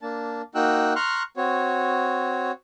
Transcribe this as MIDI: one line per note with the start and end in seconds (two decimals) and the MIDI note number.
0.02 0.42 58
0.02 0.42 62
0.02 0.42 81
0.55 0.93 58
0.55 0.93 63
0.55 0.93 66
0.55 0.93 79
0.55 0.93 88
0.55 0.93 90
0.96 1.23 82
0.96 1.23 84
0.96 1.23 85
0.96 1.23 89
0.96 1.23 90
1.37 2.52 60
1.37 2.52 66
1.37 2.52 73